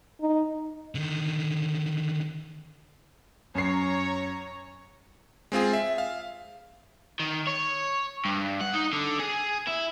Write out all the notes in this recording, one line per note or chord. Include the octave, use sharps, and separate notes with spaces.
D#4
D3 D#3
F#2 C#5 A#5 C7
G#3 C4 F4 G#4
E5
F5
D#3
C#5
G2
F#5
D#4
D3
G#4
E4